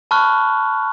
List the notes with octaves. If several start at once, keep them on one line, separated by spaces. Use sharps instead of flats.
A5 B5 C#6 F6 F#6